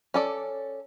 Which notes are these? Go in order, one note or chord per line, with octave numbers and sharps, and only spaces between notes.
C#4 A4 D5